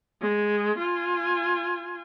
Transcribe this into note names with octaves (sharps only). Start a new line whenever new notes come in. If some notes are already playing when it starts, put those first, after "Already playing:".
G#3
F4 G#5